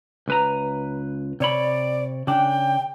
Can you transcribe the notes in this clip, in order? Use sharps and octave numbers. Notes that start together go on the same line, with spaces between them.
C#2 B4 A#5
C3 C#5 D5 B5
C#3 D4 G5